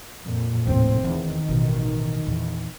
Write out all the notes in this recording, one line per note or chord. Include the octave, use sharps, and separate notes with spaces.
F2 A#2
F1 D#2 A2 C4 D#4
E2 D#3
A1 B2
E2 A#2